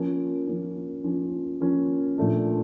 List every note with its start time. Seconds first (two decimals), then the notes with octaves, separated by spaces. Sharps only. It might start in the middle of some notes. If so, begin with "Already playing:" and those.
Already playing: F3 A#3 C#4
0.47 F3 A#3 C#4
1.04 F3 A#3 C#4
1.61 F3 A#3 C#4
2.18 A#2 F3 A3 D4